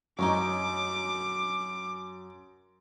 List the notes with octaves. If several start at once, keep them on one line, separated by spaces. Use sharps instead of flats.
F#2 D#4 A#4 C#5 D6